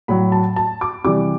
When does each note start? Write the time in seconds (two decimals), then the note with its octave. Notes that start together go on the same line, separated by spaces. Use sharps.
0.08 A2 F#3 B5
0.32 A5
0.56 A5
0.81 D6
1.04 C3 E3 G3 D6